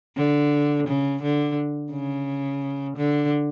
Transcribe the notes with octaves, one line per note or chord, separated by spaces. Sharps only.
D3
C#3
D3
C#3
D3